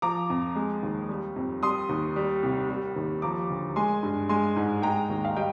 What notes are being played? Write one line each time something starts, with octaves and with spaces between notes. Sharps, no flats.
F3 A#5 D6
F2
G#3
D#2
G3
F2
G3 C6 D#6
D#2
G3
C2
G3
D#2
F3 A#5 D6
D2
G#3 G#5 C6
G2
G#3 G#5 C6
G#2
G#3 G5 A#5
D#2
F5
G3 D#5 G5